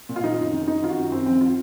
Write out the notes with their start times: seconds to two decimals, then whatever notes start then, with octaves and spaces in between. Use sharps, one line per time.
0.09 A#2
0.16 F4
0.24 D#3 D#4
0.38 F#2
0.53 D#3
0.68 D#3 D#4
0.82 D#3 F4
0.90 F#4
0.97 F#2
1.12 F#2 C4
1.26 F3 C4
1.41 F4